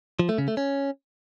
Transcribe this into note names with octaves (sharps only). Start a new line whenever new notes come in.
F3
A3
C#3
A3
C#4